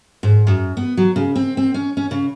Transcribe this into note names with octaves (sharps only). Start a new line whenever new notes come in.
G#2
F#2
B3
F#3
C#3
C4
C4
C#4
C#4
C#3